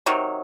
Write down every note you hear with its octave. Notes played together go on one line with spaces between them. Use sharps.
C3 D#3 F#3